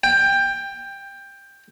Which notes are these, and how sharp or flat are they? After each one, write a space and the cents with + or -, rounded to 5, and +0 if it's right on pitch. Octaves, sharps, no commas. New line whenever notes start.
G5 +15